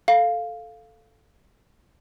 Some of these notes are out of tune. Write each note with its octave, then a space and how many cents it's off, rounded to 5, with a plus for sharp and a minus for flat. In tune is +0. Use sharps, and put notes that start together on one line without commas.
A4 +0 F5 +0